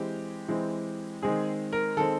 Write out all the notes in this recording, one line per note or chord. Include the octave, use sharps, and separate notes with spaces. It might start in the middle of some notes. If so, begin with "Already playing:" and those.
Already playing: E3 G#3 C4 G4
E3 G#3 C4
D#3 G#3 C4 G#4
A#4
D#3 G#3 C4 A4